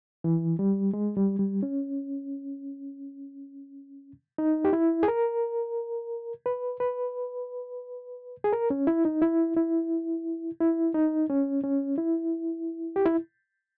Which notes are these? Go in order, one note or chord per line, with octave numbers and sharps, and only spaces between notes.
E3
G3
G#3
G3
G3
C#4
D#4
G4
E4
G#4
A#4
B4
B4
G#4
A#4
C#4
E4
D#4
E4
E4
E4
D#4
C#4
C#4
E4
G4
E4